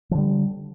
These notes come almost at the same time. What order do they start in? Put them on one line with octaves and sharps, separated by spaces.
F3 D3 G3